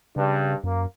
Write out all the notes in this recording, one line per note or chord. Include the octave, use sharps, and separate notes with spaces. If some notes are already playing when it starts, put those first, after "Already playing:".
G2 C#3
F#2 A#3